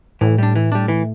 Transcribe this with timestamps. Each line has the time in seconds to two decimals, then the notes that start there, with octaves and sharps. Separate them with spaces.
0.21 A2 E3
0.38 G3 D4
0.55 E3
0.72 G3 D4
0.88 E3